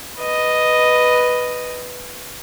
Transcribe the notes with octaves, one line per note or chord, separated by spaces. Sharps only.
B4 D#5